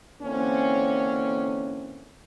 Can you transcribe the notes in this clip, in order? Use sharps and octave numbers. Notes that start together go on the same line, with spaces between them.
D3 E3 A#3 C4 C#4